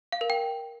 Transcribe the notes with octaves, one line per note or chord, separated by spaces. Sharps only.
F5
A#4
G5